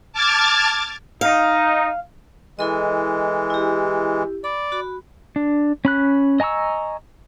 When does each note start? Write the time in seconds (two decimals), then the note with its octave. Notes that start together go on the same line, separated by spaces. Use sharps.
0.13 A5 D6 F6 G#6 A6
1.21 D#4 F5
2.59 E3 G#3 E4 A4 D#5
3.50 E4 G4
4.44 D5 B5
4.72 F#4 B5
5.36 D4
5.85 C#4 B5 F#6
6.40 D#5 G#5 A#5 C#6 E6